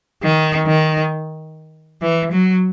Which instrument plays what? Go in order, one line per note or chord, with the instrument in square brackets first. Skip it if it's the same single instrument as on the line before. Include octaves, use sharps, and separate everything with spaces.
[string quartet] D#3
D#3
E3
F#3